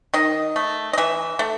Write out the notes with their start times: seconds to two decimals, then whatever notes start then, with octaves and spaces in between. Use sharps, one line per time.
0.14 D#3 D#5
0.56 A3
0.93 D#5
0.98 E3 E5
1.39 A3